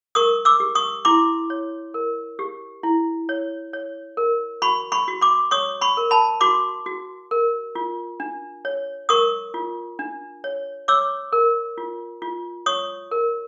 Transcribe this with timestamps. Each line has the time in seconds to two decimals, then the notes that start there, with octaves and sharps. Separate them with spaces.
0.15 A#4 C#6 D#6
0.45 D6 E6
0.60 G4
0.75 C#6 D#6
1.05 E4 C6 D6
1.50 C#5
1.94 A#4
2.39 G4
2.83 E4
3.29 C#5
3.73 C#5
4.17 A#4
4.62 F#4 B5 C#6
4.92 B5 C#6
5.08 F#4
5.21 C6 D6
5.51 C#5 C#6 D#6
5.81 B5 C#6
5.97 A#4
6.11 A5 B5
6.41 F#4 C6 D6
6.86 F#4
7.31 A#4
7.75 F4
8.20 D4
8.65 C#5
9.09 A#4 C#6 D#6
9.54 F4
9.99 D4
10.44 C#5
10.88 C#5 D6 E6
11.32 A#4
11.78 F4
12.22 F4
12.66 C#5 C#6 D#6
13.11 A#4